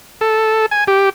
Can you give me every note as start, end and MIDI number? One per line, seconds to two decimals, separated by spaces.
0.21 0.66 69
0.71 0.84 80
0.87 1.09 67